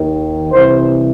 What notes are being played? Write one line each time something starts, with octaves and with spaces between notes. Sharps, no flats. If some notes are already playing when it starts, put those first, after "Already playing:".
Already playing: D#2 D#3
C2 C3 E3 C5